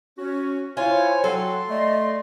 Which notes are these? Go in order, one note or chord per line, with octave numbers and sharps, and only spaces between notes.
C#4 F#4
E4 F4 C5 C#5 G#5
F#3 F#4 A4 G5 C6
A3 D5 D#5